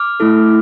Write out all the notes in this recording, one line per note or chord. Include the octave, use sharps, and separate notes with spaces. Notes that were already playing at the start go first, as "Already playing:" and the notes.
Already playing: D6 F6
A3 E4 A4